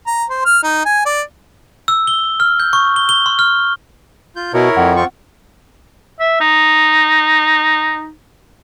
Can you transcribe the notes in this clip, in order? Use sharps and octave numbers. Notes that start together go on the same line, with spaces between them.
A#5
C5
F6
D#4
G#5
D5
E6
G7
F6
G6
C#6
G7
G7
C6
F6
F4 G6
B2 E4 A#4 C#5
F2 F#5
C4 F4 C#6
E5
D#4